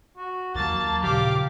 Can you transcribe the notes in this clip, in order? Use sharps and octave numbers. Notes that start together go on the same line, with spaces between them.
F#4
D#2 F#3 A#3 A5 A6
A#2 C#3 F3 G4 F5 D6